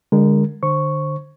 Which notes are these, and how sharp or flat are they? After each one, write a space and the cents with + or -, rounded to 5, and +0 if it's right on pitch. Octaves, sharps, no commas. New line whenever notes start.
D3 +0 G#3 -30 A#4 +0
D3 +30 C5 +15 C#6 +0